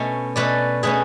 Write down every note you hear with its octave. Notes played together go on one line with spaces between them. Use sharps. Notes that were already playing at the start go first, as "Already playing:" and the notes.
Already playing: B2 A3 C#4
B2 A3 C#4 B4 D5
B2 A3 C#4 G#4 B4